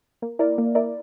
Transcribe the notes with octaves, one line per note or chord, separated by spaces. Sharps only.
A#3
E4 A#4 D5
A#3
E4 A#4 D5